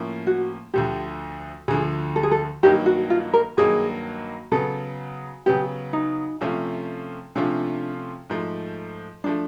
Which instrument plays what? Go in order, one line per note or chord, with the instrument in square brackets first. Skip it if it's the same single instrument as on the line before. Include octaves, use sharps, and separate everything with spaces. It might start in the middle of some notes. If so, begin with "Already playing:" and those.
Already playing: [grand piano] A2 F3 A#3 C#4
[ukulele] F#4
[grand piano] D2 D3 F3 [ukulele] G4
[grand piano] D2 D3 F3 [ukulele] G#4
[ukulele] A4
G#4
A4
[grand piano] G2 D#3 F#3 A#3 D#4 [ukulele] G4
[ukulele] F#4
F4
A#4
[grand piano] G2 D#3 F#3 A#3 D#4 [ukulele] G#4
[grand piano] C#3 F#3 B3 [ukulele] A4
[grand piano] C#3 F#3 B3 [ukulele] G4
[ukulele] D#4
[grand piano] C3 F3 A3 C#4 F4
[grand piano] C3 F3 A3 C#4 F4 [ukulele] D4
[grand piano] G#2 F3 A3
[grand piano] F3 A3 [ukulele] D4